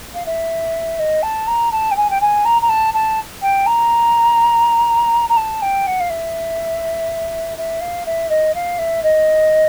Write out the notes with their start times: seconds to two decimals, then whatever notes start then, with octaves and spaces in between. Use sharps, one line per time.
0.14 F5
0.26 E5
0.99 D#5
1.22 A5
1.47 A#5
1.72 A5
1.91 G5
1.96 G#5
2.10 G5
2.21 G#5
2.45 A#5
2.62 A#5
2.69 A5
2.94 A5
3.42 G5
3.66 A#5
5.29 A#5
5.37 A5
5.62 G5
5.86 F#5
6.00 F5
6.10 E5
7.57 E5
7.81 F5
8.06 E5
8.29 D#5
8.54 F5
8.78 E5
9.03 D#5